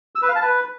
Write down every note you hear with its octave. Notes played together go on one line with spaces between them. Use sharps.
E6
B4
F5
A5
B4